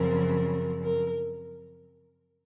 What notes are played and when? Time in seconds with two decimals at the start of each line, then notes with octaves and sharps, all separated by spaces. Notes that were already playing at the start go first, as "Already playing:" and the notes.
Already playing: F#2 C#3 F3 C4 A#4
0.83 A#4